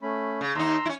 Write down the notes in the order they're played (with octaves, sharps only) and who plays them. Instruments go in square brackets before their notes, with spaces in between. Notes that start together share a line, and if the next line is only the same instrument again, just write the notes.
[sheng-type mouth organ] A3 C#4 B5
[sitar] C#3
[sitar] D#2 D#4 [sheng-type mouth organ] A#5 C6 E6
[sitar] C#4 E4